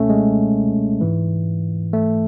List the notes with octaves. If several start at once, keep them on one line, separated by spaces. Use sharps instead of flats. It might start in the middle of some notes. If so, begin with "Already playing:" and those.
Already playing: C#2 B2 A3 C#4
G#3
G#2 E3
A3